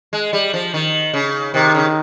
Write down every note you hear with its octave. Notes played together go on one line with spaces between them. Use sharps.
G#3
G3
F3
D#3
C#3
C3 D#3
C#3